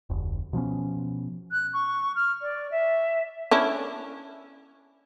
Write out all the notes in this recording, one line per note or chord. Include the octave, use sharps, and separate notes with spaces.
F1 D2
B2 F3 B3 C#4
F#6
C#6
F6
D5
E5
C#4 D4 E4